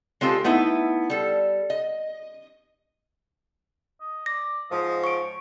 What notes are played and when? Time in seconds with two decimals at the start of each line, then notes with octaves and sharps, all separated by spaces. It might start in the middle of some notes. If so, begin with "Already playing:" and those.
0.21 G#3 C4 F4 G4 A4
0.44 A3 B3 D#4 E4
1.10 G3 A4
1.70 D#5
4.00 D#5
4.26 D5 A#6
4.70 G#2 F3 D#5
5.04 C#5 C#6 D7